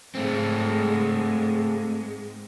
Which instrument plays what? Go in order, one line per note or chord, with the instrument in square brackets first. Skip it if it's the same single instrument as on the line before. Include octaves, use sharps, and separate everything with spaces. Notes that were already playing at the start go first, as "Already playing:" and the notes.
[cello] G#2 G#3 [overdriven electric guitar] A3 C4